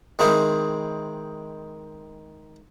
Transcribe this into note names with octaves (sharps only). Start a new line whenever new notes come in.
D#3 G#3 C4 E4 C5